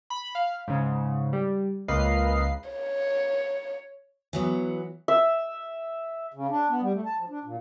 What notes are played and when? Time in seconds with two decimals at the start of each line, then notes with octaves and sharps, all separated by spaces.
0.10 B5
0.35 F5
0.67 G#2 C#3
1.33 G3
1.88 C#2 A#3 B4 D#5 F5 C7
2.70 C#5
4.33 E3 F#3 B3
5.08 E5
6.34 C#3
6.50 D4
6.69 B3
6.82 G3
6.94 A3
7.05 A5
7.18 F3
7.30 D4
7.44 A#2